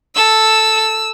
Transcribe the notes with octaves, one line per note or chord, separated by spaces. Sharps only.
A4 E6